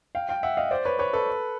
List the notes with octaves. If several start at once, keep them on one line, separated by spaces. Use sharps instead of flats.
F5 G5
F5 G5
E5 F#5
D#5 F5
C5 D5
B4 C#5
B4 C#5
A4 B4